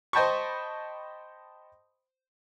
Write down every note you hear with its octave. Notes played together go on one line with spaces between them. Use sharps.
C5 D#5 G5 A5 B5 C#6